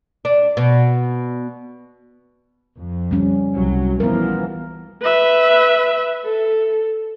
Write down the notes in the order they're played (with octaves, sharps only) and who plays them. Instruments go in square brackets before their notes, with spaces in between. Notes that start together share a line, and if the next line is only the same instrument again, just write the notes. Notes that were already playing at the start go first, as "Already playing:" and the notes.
[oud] D4
B2
[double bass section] F2
[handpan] G3 C#4
[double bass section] C2 F#3
[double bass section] E3 F3 [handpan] B3 A#4
[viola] B4 E5
A4